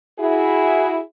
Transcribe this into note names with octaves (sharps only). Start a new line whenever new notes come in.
E4 F#4 G#4